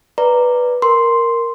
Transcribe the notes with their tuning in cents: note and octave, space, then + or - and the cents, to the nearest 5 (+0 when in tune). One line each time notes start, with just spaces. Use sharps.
B4 -5 D5 +0 A#5 -10
A#4 +0 C6 +0